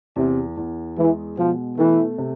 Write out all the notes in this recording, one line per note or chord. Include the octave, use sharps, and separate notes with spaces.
E2 C3
E2
E3 G#3
B2 F3
E3 A3
C3